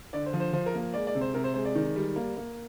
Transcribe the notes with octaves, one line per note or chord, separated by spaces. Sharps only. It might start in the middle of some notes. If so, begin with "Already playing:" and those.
D3 D5
C5
F3
C5
F3 C5
A#4
A#3
G#3 D5
D5
C3
C5
C3 A#4
C5
G#3 C5
D5
D#3
G3
A#3
A#3